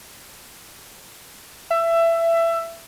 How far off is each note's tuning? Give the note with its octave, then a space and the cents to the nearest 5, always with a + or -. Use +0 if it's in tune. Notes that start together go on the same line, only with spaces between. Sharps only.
E5 +20